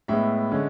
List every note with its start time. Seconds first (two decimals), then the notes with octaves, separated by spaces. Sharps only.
0.08 A2 G#3 B3 E5
0.52 D3 G#3 C#4